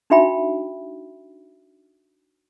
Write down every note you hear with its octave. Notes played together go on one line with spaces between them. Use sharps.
D4 D#4 F#4 E5 G5 B5